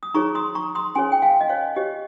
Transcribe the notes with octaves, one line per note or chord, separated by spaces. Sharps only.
D#6
D#4 G#4 C#5 A#5 C#6
C6 D#6
A#5 C#6
C6 D#6
C#4 G#4 C#5 G#5 C6
G5
F5 G#5
D#5
C#5 F5
G4 C#5 D#5